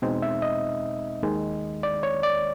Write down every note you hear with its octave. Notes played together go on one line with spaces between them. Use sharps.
E2 B2 G#3 C4 D#4
E5
D#5
D#2 D#3 G#3
D5
C#5
D5